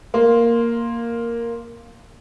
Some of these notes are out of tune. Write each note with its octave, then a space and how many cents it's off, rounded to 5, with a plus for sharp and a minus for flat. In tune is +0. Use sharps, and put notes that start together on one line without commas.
A#3 +0 C6 +0